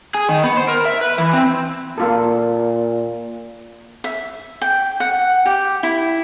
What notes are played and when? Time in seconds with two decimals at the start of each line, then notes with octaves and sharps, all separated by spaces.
0.15 G#4
0.29 D#3
0.44 B3
0.57 C5
0.68 A#4
0.85 E5
1.01 B4
1.18 E3
1.33 C4
1.98 A#2 A#3 F4 A4
4.04 E5
4.62 G5
5.00 F#5
5.45 G4
5.83 E4